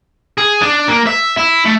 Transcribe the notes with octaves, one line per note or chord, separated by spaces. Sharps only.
G#4
D4
A#3
E5
E4
A3